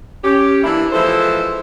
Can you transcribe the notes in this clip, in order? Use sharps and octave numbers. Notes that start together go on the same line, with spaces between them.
C#4 G4
E3 A#3 D4 E4
E3 F3 G#3 A4 C5 E5